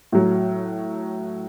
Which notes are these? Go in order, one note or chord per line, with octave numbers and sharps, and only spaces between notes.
A2 F#3